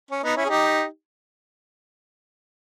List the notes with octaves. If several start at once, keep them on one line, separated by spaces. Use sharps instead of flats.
C#4
B3 D#4
C#4 E4
G#4
D#4 G4